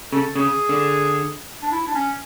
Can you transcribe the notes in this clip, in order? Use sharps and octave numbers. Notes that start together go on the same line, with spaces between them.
C#3 A4
C#3 G#4
D3
D4
E4
D4
C#4